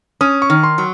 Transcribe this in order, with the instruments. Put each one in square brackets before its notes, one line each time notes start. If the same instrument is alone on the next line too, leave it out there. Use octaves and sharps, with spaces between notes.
[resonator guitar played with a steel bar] C#4 [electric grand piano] D#6
[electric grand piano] C#6
[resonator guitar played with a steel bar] D#3
[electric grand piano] C6
[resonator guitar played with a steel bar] F#3